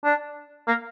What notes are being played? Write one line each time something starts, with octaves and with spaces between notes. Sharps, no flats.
D4
A#3